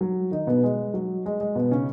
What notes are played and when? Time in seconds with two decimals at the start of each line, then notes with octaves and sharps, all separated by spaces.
0.01 F#3
0.31 D#3 D#4
0.47 B2 B3
0.63 G#3
0.94 F#3
1.26 G#3
1.40 G#3
1.55 B2 B3
1.71 C#3 C#4